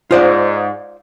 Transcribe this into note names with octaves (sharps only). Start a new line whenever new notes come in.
G#2 F4 C5 D5